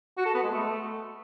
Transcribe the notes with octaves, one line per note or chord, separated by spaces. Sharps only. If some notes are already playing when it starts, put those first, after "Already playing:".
F#4
A4
B3
G#3
A3